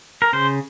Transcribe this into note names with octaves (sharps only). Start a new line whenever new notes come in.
A#4
C#3 C5